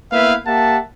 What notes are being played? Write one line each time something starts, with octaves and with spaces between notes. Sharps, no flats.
A#3 B3 E4 B4 E5 F5
A#3 G4 E5 F#5 A5